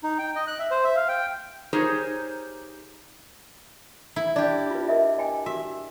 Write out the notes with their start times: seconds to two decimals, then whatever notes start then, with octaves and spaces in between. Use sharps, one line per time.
0.04 D#4
0.18 G5
0.35 D#5
0.47 F#6
0.59 E5
0.71 C5
0.85 E5
0.96 F5
1.09 G5
1.73 D#4 G4 G#4 A#4 C5 C#5
4.16 E4
4.36 D4 G4 D5
4.71 F4 B4
4.88 A#4 D#5 E5
5.18 D#5 G5 G#5
5.46 F#4 E5